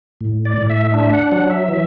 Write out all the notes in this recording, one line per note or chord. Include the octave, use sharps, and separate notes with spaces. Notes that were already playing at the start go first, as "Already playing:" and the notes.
A2
D5
A2
E5
D4 E5
F#5
F#3 F#5
E5
E3